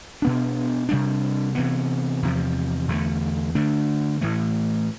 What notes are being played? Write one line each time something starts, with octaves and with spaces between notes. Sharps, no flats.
B2 B3 D4
C3 G3 D4
C3 E3 B3
E2 C3 F3
E2 D3 A3
D3 A3 D4
A2 E3 A3